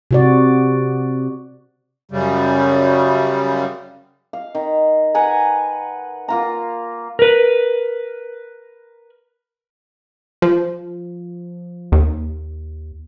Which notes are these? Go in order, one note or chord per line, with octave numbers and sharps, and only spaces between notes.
C3 F#4 D5
F#2 C#3 G3
F5
D#3
B4 F#5 G#5 A#5
A#3 F4 A#5
A#4 B4
F3
D#2